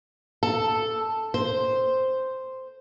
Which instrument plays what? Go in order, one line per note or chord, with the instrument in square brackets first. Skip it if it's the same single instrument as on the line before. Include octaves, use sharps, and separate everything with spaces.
[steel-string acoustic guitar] A4
C5